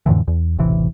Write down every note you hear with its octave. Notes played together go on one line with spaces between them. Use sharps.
F2 A2 D3 E3
E2
E1 A1 C3 E3